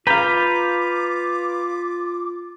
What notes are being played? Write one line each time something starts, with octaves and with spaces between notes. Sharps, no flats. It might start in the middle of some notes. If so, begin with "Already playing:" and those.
F4 B4 F5 A#5 D6 G6 B6